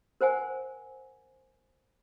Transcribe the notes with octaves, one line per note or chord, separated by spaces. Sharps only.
A#4 C5 F#5 G#5